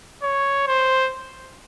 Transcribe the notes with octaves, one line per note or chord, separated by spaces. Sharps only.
C#5
C5